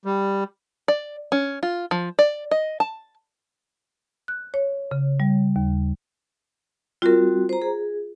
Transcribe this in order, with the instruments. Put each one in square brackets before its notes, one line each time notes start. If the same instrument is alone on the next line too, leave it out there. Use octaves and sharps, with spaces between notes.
[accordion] G3
[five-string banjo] D5
C#4
F4
F3
D5
D#5
A5
[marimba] F#6
C#5
C#3
G3
D#2
[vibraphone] G3 C4 F#4 [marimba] F4 A#4
[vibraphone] C5 A#5
G#4